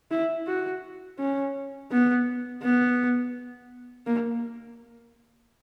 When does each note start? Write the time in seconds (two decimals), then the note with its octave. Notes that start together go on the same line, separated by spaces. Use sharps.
0.11 E4
0.47 F#4
1.19 C#4
1.92 B3
2.63 B3
4.07 A#3